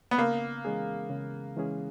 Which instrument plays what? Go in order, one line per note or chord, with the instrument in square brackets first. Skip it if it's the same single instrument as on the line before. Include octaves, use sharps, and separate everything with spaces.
[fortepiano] B3
[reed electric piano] C#3 [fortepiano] A#3
[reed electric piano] E3 G#3 C#4 G#4
C#3
E3 G#3 C#4 G#4